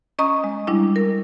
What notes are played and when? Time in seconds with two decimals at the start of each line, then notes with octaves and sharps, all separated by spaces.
0.19 C#4 D#5 A#5 C#6 D#6
0.44 G#3
0.67 G3 D4 E4
0.96 A#4